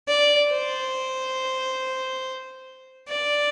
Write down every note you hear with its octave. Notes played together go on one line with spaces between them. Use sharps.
D5
C5
D5